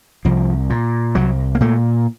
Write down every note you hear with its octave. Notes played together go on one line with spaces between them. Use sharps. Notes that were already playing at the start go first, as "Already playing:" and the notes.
C2 F3
A#2
C2 F#3
A#3
A#2 A3